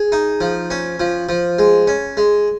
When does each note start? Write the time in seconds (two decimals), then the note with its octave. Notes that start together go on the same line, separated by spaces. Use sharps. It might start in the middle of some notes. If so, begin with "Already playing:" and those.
Already playing: G#4
0.12 D#4
0.41 F3
0.70 C#4
1.00 F3
1.29 F3
1.59 G#3
1.88 C#4
2.17 G#3